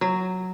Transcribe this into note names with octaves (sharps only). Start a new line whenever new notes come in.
F#3